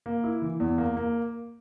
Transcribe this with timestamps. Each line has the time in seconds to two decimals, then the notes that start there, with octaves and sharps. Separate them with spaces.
0.06 A#3
0.24 E4
0.42 E3
0.60 E2
0.78 A#3
0.97 A#3